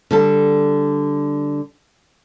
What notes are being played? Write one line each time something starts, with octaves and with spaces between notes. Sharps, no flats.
D3 G3 A4